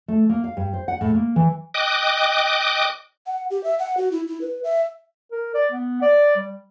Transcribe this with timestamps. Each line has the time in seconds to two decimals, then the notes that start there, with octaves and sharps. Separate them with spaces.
0.08 A3
0.29 A#3
0.44 F5
0.57 G2
0.73 C5
0.88 F#5
1.01 A2
1.15 A#3
1.36 E3
1.74 D#5 G5 D6 D#6 F#6
3.26 F#5
3.50 G4
3.64 E5
3.79 F#5
3.97 F#4
4.12 E4
4.27 E4
4.41 B4
4.64 E5
5.32 A#4
5.54 D5
5.72 B3
6.02 D5
6.36 G3